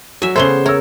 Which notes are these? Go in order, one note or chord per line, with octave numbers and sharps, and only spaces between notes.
F#3 E5 G#5
C#3 B3 A4 C5 C#5 G7
A#4 C#5 E6